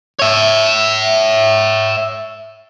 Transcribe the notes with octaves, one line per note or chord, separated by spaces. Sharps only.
C#5 E5